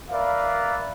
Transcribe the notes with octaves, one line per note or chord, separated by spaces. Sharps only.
A#4 B4 D5 E5 F5